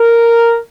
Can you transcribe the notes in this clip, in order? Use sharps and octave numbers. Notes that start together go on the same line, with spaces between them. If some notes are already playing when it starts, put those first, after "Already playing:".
Already playing: A#4